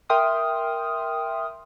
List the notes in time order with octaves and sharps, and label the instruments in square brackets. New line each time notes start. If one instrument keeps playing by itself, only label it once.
[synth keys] A#4 E5 G5 C6 D#6 F6